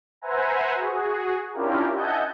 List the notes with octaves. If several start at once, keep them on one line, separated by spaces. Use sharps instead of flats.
B4 C5 E5 F#5 G#5 A#5
F#4 G#4
C#4 D4 E4 F4 G4 A#4
D#5 E5 F#5 G#5 A5 G6